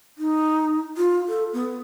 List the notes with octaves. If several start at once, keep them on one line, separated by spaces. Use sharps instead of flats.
D#4
F4
A4
B3